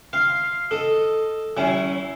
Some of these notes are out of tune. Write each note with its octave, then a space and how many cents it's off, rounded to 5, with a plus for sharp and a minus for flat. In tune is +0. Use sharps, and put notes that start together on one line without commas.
F5 +0 C6 +10
A4 +0 D#5 +0
F#3 +45 C#4 +0 E4 +0